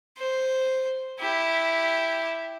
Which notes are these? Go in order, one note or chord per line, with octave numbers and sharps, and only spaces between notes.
C5
E4 G4